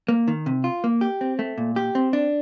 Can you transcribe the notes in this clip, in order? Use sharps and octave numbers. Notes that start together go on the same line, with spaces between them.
A#3
D#3
C3
F4
A#3
G4
C4
A3
A#2
G4
C4
D4